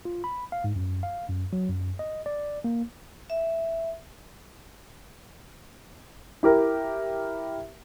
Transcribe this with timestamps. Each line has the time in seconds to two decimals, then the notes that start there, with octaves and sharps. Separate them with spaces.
0.05 F4
0.24 B5
0.52 F5
0.64 G#2
0.76 F#2
1.03 F5
1.29 F#2
1.53 F#3
1.69 F#2
1.99 D#5
2.26 D5
2.64 A#3
3.30 E5
6.43 E4 G4 A#4